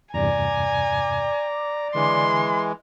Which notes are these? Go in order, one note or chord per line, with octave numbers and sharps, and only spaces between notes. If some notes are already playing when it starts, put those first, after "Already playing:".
E2 G2 C3 D5 G#5 A#5
D3 E3 G#3 C6